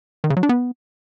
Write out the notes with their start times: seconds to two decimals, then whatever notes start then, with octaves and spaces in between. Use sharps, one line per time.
0.24 D#3
0.30 C#3
0.37 F#3
0.43 D4
0.49 B3